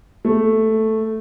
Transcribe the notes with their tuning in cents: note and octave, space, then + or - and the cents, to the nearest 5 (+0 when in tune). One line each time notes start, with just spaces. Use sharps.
A3 +0